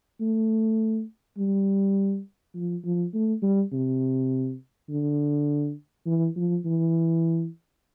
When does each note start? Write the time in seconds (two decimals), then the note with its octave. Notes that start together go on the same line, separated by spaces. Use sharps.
0.20 A3
1.38 G3
2.55 F3
2.84 F3
3.14 A3
3.42 G3
3.72 C3
4.90 D3
6.06 E3
6.36 F3
6.65 E3